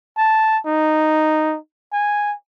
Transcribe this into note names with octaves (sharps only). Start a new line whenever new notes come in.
A5
D#4
G#5